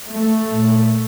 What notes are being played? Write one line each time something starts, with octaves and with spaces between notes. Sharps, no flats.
A3
A#2